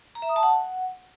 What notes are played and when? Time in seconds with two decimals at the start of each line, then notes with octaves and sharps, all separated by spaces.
0.15 A#5
0.22 E5
0.29 D#6
0.36 A5
0.43 F#5